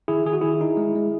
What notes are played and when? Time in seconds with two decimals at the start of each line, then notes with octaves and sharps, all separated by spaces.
0.08 D#3 E4 G#4
0.25 D#3 G#4
0.33 F#4
0.41 D#3 E4 G#4
0.61 D#4
0.77 G#3
0.95 G#3